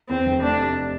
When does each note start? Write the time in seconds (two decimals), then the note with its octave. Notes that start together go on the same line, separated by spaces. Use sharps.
0.09 E2 C4
0.26 F1
0.43 A3 D4
0.59 C3